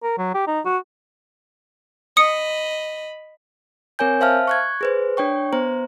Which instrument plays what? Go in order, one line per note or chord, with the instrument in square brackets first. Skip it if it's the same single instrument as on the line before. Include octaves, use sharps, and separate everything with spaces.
[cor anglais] A#4
F#3
G4
D#4
F#4
[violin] D#5 B5 [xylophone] D#6 C#7
[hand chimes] C4 A#4 C#5 G#5 G6
C5 E5 F5 A5 F6
C#6 F#6 G#6
G#4 B4 C5
D4 C#5 G5 C#6
B3 C5 A#5